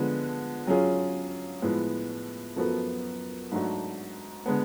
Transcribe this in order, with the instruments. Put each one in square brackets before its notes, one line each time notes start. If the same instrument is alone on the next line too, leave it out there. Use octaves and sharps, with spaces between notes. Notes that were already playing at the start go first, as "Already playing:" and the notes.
Already playing: [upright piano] D3 F3 G#3 B3
F#3 C#4 F4 G#4
A2 F3 G#3 B3
F#2 F3 B3 F#4 A4
G#2 F#3 A3 D4 F#4
D3 G#3 B3